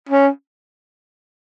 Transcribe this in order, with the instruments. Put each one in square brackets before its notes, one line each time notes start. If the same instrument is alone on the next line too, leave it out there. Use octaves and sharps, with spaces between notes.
[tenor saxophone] C#4